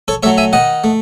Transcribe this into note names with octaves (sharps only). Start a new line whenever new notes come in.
A4 C#5
F#3 A3 C#5 E5
E5 G#5
D#3 D#5 F#5
A3